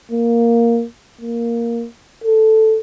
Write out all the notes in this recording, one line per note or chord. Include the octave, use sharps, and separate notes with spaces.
A#3
A#3
A4